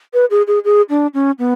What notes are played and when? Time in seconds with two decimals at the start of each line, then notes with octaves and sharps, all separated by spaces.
0.14 B4
0.31 G#4
0.47 G#4
0.64 G#4
0.90 D4
1.14 C#4
1.39 B3